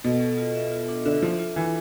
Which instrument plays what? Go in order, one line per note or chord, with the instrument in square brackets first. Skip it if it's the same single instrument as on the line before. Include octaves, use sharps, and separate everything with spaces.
[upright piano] B2 [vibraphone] A4
[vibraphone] A4
F4
E5
F4
D4
[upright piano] D3 [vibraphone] E5
[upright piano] F3 [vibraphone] E5
[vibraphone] F4
[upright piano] E3 [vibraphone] F4